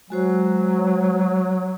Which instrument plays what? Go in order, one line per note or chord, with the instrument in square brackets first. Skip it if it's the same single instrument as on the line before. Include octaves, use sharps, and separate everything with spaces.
[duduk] F#3 [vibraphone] G#3 F#4 C5